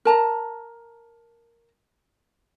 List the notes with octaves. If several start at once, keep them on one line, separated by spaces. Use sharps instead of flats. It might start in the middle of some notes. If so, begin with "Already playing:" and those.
A#4 A5 A#5